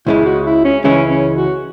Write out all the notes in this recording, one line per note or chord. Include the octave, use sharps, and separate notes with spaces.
C#2 C#3 G#3 E4
F#4
E4
C#4
C#2 C#3 E3 G#3 C#4 E4
C#4
F#4